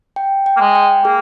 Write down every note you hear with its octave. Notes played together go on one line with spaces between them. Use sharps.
G5
G5
A#3
G#3
G5
A#3 G#4